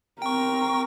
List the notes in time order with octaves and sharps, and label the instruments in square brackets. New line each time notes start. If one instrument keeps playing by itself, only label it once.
[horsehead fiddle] C4 A#4 [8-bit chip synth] G5 C#6